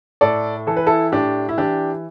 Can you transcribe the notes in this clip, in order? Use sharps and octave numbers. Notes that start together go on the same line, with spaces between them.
A2 A4 D5
E3 A4
B4
E4 A4
A2 D4 G4
E4
E3 D4 G4